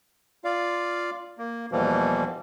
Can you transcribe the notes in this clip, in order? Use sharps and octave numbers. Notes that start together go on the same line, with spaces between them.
F4 D5 F5
A#3
E2 B2 E3 F3 G3 A#3